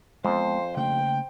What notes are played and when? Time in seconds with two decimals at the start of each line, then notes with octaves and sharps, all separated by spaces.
0.25 F2 G#3 B3 C5
0.77 C#3 A3 A#3 G5